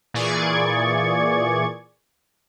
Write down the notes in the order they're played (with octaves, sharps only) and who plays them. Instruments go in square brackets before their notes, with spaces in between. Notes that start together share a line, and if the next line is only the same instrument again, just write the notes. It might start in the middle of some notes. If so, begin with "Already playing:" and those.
[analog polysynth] A#2 E3 G#4 D5 C#6 G#6